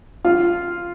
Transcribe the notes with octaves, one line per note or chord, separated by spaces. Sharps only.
F4